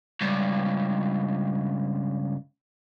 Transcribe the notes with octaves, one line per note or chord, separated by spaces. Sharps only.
C#2 G2